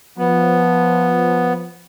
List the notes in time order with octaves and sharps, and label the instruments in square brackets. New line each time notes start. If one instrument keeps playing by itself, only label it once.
[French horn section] F3 [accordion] B3